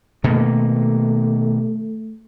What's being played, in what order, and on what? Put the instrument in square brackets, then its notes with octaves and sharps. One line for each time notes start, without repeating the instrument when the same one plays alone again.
[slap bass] B2 D#3 A#3 [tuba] A3